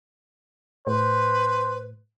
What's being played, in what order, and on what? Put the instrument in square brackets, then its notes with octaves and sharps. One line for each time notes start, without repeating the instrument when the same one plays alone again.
[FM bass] A2 [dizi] B4 [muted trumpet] C5